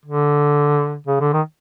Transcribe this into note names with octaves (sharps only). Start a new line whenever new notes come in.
D3
C#3
D3
D#3